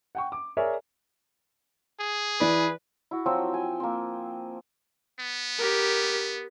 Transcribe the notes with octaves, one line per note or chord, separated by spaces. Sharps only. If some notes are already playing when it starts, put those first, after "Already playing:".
F#5 G5 C#6
D6
G#4 A#4 C#5 D5 E5
G#4
E3 B4 D5
E4 F#4
F3 F#3 C4 E6
G5 G#5
A#3 C4
B3
G4 A#4